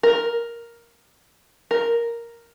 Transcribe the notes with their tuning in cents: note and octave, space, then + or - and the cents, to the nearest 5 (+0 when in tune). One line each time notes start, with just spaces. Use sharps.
A#4 +5
A#4 +0